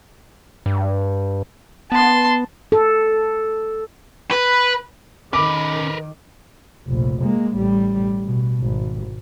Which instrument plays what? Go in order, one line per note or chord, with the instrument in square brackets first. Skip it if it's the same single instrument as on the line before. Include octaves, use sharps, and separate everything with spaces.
[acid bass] G2
[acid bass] B3 [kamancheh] A5 C6
[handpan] A4
[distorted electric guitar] B4
[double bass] D#3 [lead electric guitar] C#4 B5 [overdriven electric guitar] A#4 B4 [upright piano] D6
[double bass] F1 A#1
G#3 A#3
A1 G3
B2
G#1